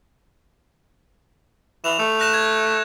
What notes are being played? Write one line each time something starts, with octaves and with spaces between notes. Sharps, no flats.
E3 E7 F7
A3
F#6 A#6 E7
G#6